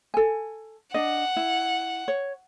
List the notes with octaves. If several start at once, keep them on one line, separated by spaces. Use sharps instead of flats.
A4 G#5
D4 D#5 F#5
E4
C#5